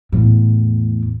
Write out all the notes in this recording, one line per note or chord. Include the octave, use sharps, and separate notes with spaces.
E2 A2